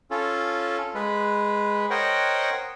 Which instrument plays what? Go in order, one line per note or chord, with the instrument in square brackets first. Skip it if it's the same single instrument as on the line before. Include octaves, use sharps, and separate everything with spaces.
[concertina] C#4 F4 A4
G#3 B4
A#4 C5 C#5 D#5 F#5 G5